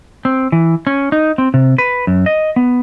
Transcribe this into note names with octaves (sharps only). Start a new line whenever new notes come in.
C4
E3
C#4
D#4
C4
C3
B4
F#2
D#5
B3